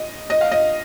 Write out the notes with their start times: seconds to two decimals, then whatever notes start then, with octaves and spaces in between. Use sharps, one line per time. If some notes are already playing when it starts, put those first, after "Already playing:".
Already playing: D#5
0.30 D#5
0.41 F5
0.52 D#5